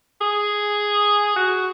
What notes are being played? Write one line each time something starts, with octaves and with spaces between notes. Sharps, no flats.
G#4
F#4